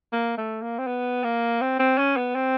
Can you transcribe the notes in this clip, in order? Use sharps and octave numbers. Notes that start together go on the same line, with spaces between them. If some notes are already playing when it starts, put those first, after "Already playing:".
A#3
A3
A#3
C4
B3
A#3
C4
C4
C#4
B3
C4